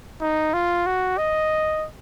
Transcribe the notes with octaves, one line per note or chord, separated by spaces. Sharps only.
D#4
F4
F#4
D#5